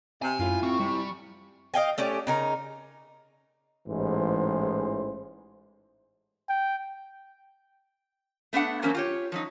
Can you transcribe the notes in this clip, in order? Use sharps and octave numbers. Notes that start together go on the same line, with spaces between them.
C3 G#5
F#2 A2 E4 F4
C4 C#6
C3 G3
D#5 F5 G5 G#5
A3 C#4 G4 D5
C#3 D#4 A#4
A1 G#2 E3 G#3 G#4 C5
G5
A3 B3 D4 D#5 F#5
E3 F#3 A#3 C4 C#4
F4 G4 C#5
F3 F#3 D#4